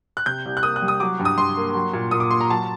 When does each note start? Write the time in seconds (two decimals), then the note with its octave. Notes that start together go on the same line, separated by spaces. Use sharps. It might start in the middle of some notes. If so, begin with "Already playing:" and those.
0.17 F#6
0.26 C3 G6
0.45 C2
0.57 F#6
0.63 A#3 D#6
0.76 F#6
0.82 G3
0.88 D#6
1.00 F#3 D6
1.19 G2
1.25 D#6
1.38 G2 C6
1.57 A#3
1.75 F#3
1.93 A#2
2.11 A#2 D#6
2.20 D6
2.31 A#3 C6
2.41 A#5
2.50 F#3 A5